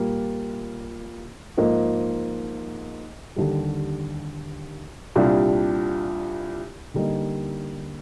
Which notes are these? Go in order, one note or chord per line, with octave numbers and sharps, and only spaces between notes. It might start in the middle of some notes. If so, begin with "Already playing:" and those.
Already playing: A#2 G3 A#3 F4
G#2 F3 A#3
D#2 D3 G3
C2 A#2 G3 D4
D3 G3 A#3 D#4